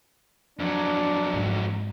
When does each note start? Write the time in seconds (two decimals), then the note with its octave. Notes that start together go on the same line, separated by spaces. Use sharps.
0.59 F2 F#3 D4
1.33 G#2 G#3